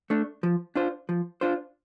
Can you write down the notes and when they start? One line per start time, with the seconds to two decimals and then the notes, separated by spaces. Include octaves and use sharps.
0.10 A3 D4
0.43 F3
0.76 D4 F4 C5
1.09 F3
1.41 D4 F4 C5